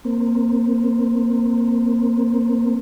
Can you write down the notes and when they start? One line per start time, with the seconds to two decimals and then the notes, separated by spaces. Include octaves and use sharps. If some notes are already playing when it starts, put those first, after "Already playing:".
0.05 A#3 C4